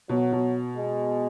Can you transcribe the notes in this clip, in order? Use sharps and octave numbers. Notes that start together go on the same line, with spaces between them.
B2 F#3
B2
G#3